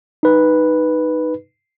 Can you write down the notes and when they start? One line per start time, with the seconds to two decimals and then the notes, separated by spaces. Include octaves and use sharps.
0.23 D#4 B4